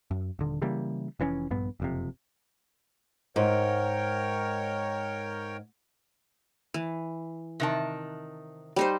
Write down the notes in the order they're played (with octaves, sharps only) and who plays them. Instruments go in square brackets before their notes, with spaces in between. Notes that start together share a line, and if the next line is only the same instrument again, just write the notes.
[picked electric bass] F#2
D#1 D3
C#3 E3 G3 A#3
F1 E3 C4 C#4
A#1 G2 B3
F#1 F2 C3
[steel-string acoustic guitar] G#2 [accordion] A#4 C#5 G5
[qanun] E3
[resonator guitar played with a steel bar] C3 D#3 A5
[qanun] G3 D#4 C5